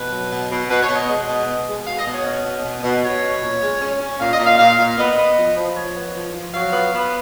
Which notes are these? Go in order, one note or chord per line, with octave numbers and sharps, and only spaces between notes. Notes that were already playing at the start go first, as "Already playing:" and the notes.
Already playing: B2 B4
F#3
B2
B2
B2 B4
C#5
B2
D#5
G#3 D#5
B2
B3
G#3
B2 F5
D#5
B2
C#5
C#4 D#5
B2
B2
B2
B2 C#5
C#4
A#2
G#3
C#4
C#4
A#2 F5
D#5
A#2
F5
A#2 F5
A#2
B3 D#5
B3
F3
F3
F3 C#5
B3
F3
F3
F#3 F5
B3
B3